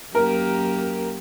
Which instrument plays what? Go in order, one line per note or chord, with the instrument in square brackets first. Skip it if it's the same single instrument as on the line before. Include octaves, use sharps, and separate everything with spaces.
[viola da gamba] F#2 A#3 G4 [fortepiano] A#4